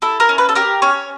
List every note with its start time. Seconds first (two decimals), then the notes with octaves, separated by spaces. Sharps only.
0.02 E4 A4
0.20 A#4
0.29 C#4
0.38 B4
0.49 A4
0.55 G4 A#4
0.82 C#4 C#5